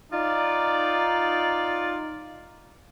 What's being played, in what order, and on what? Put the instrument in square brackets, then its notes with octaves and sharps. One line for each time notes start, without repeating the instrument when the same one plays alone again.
[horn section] D#4 F4 D5